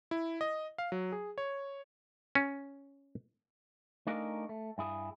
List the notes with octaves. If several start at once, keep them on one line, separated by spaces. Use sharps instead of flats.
E4
D#5
F5
F#3
G#4
C#5
C#4
A3 D4 D#4 G#4 A#4 F5
A3
G2 E4 G#4